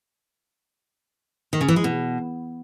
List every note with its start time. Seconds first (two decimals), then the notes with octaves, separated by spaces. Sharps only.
1.53 D#3
1.61 C#3
1.68 E3
1.76 G#3
1.84 B2